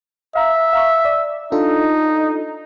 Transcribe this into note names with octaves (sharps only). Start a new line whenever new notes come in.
E5 F5 A#5
F5 A#5 C#6
D5
D4 D#4 F4 A4